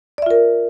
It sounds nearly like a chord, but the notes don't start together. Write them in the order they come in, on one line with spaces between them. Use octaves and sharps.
D5 E5 F4 A#4